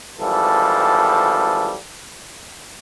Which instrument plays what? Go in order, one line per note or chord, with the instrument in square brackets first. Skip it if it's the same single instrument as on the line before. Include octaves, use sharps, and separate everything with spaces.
[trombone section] G#1 E3 F3 G3 A4